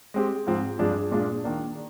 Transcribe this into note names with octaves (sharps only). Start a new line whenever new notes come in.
G#3 C4 G4
G#2 F3 C4
G2 F3 G#3 D4 G#4
A#2 G#3 D4 F4
D#3 A#3 D4